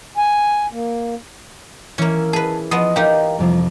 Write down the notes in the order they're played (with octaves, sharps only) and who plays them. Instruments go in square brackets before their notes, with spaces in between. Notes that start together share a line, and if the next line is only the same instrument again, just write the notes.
[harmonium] G#5
A#3
[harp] E3 E5 [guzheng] A#3 C#4
[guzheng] G#4 B4 [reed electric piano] A5
[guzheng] F3 B3 D#5 [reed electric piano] D#6
[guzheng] D#4 G4 [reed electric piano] A#4 F5 G5
[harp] F2 C3 F3 [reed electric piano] G3 F4